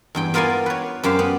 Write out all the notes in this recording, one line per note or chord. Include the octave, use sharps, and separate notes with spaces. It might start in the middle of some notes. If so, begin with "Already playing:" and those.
E2 G2 G5
B3 F4 A#4 D5 F5 G#5
B4 C#5
F#2 G4 C5 F5
B3